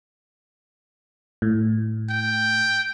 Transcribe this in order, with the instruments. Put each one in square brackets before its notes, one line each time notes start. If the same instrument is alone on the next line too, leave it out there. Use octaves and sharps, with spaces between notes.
[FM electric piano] A2
[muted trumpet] G5